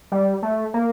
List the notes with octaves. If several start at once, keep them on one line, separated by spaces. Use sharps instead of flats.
G3
A3
A#3